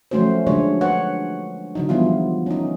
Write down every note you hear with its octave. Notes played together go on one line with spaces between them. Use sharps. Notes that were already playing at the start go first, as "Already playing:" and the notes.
F3 F#3 A3 C#4 F#4 C5
D3 F#3 G#3 D4 C#5
B4 C#5 F#5
D3 F#3 D#4
E3 F3 G3 B3 E4 F4
C#4 D#4